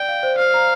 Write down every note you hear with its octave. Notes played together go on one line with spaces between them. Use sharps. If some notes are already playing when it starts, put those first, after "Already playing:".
Already playing: D5 G5
F5
C5
C5 F5
A#5